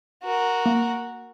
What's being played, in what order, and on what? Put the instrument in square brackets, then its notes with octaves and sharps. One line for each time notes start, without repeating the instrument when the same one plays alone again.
[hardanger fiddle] F#4 A#4
[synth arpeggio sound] A#3